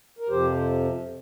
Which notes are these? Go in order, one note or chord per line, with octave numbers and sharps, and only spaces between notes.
A#4
F2 C3 F3 G4 C5